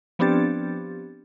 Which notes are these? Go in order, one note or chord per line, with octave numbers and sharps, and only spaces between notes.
F3 B3 C4 D4 G4 A6